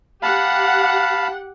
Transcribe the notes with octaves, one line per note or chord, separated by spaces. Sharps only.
G4 F5 F#5 A5 B5